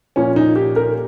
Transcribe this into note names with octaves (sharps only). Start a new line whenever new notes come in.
A#2 F3 C#4
D#4
G4
A#4